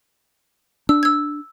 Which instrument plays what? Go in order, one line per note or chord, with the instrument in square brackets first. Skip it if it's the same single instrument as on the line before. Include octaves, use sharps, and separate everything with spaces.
[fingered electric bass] D4 [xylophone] E6
[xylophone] E6 G#6